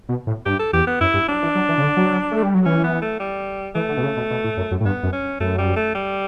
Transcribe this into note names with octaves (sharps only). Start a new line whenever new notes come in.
B2
A2
G2 G4
A4
E2 G4
B3
F#2 E4
G2
F#3 D4
E3
F#3
E3
C#3
D3
F#3
A3
G3
F#3
E3 C#4
B3
A3
G3
E3 A3
D3
B2
C#3
B2
B2
A2
F#2
F#2
A2
G2 B3
F#2
C#4
F#2 A3
G3
A3
G3